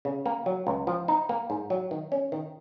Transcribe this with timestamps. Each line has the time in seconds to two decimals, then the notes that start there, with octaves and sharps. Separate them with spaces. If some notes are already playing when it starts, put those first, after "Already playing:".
0.05 C#3
0.26 A#3
0.46 F#3
0.67 C#2
0.87 F3
1.08 D#4
1.29 A#3
1.50 G#2
1.70 F#3
1.91 D#3
2.12 C#4
2.32 D#3